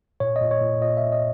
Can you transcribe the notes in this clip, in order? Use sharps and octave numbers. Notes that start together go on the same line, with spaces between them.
A#2 C#5
D#5
A#2
C#5
A#2
A#2 D#5
A#2 E5
D#5